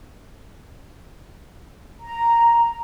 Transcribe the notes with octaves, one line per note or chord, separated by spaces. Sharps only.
A#5